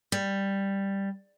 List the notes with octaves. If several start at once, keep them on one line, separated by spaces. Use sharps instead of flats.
G3